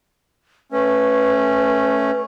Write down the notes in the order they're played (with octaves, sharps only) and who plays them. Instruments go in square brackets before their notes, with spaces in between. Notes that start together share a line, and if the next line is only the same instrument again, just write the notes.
[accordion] A3 C#4 [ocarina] B4